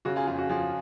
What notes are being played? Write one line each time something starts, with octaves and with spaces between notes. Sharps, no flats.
C#3 F#4
F4 G#4
F2 F4 G#4
F#4
F3 F4 G#4